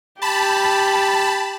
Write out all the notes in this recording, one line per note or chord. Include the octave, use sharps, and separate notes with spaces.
G4 A5 B5